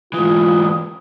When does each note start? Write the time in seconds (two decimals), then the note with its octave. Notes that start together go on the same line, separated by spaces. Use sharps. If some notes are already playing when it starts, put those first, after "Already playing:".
0.13 G#2 E3 F4 D#6